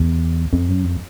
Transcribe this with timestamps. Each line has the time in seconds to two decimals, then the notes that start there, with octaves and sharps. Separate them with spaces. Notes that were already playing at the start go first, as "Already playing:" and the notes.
Already playing: E2
0.53 F2
0.69 F#2
0.84 F2